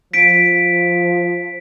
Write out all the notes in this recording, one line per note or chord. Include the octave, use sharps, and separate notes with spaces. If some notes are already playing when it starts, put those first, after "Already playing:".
F3 B6 D7